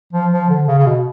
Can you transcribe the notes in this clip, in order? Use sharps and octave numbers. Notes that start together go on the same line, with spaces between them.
F3
F3
D3
C#3
C#3
B2